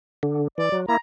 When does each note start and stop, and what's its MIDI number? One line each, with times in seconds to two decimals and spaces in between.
0.23 0.48 50
0.58 0.69 52
0.58 0.77 74
0.72 0.86 54
0.88 0.97 58
0.88 0.97 64
0.88 0.96 82